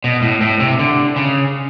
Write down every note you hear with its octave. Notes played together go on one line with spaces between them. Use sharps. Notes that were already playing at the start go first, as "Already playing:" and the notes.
B2
A2
A2
C3
D3
C#3